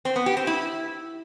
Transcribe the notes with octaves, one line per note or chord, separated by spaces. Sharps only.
C4
B3
G4
C4
E4